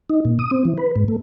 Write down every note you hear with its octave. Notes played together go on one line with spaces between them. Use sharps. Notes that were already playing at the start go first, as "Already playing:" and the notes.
D#4
A#2
D#6
C4
E3
B4
G#2
A3